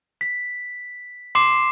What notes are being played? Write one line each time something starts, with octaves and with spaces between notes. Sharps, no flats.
B6
C6 D6 C7 E7